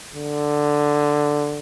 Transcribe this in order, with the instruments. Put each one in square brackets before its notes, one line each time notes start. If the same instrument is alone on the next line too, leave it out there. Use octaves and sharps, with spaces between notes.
[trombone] D3